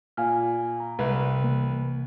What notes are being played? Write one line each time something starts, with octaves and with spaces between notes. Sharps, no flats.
A#2 F5 G#5 F6
A#5
C2 B4
C3 E3 A#3